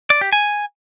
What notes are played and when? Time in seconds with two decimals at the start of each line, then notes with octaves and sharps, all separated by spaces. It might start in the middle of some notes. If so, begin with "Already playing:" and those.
0.10 D5
0.21 G4
0.33 G#5